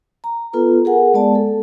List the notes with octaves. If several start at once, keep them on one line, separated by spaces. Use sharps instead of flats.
A#5
B3 F4 A4 B4
G#4 A#4 F#5 G#5
G#3 B3 D5 A5
A4